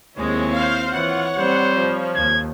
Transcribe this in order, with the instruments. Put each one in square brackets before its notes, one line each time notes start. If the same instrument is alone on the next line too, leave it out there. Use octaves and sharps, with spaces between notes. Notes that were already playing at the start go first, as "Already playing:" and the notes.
[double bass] D#2 [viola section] G#3 [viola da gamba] C4 E4 [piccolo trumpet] C#5
[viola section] C5 F5
[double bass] E3 [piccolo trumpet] F4 [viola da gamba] C#5 [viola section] F#5
[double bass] G3 C4 [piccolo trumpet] C5
[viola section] F3
[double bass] D#2 [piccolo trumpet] G#6